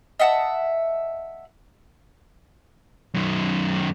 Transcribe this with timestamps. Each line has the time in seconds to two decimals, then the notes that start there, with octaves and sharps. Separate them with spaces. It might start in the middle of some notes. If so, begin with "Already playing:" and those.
0.20 D#5 E5 F#5 A5
3.14 F#2 D#3